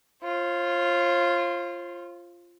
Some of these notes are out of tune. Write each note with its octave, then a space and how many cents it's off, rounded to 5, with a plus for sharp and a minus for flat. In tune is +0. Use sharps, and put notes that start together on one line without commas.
F4 -10 C5 +45